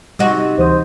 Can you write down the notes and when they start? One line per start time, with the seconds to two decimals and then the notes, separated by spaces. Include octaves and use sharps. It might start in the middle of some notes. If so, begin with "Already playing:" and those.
0.19 C3 G3 D#4 F#4
0.58 D2 E3 C5 D#6